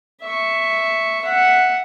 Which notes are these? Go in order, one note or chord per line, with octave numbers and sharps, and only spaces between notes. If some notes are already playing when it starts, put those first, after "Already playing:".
E5 C#6
E5 F#5